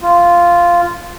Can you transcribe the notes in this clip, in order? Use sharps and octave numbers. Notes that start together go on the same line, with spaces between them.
F4